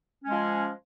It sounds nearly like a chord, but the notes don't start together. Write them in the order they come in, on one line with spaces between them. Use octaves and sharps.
C#4 G#3 F3